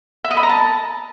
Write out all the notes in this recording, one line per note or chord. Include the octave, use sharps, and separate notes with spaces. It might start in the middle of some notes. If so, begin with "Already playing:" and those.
E5
D#5
B5
A#5
A5